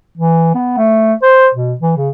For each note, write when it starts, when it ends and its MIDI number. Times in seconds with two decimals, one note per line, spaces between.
0.18 0.53 52
0.55 0.77 59
0.77 1.13 57
1.22 1.48 72
1.55 1.74 47
1.80 1.94 52
1.97 2.10 49